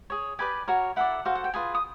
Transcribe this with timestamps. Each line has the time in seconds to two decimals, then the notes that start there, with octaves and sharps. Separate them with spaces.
0.10 G#4 C#5
0.39 G4 B4 D5 G#5
0.68 F#4 A#4 C#5
0.96 E4 A4 D5 F#5
1.25 F#4 A4 C5 F5
1.35 F#5
1.44 G5
1.54 F4 G#4 B4 G#5
1.75 D#6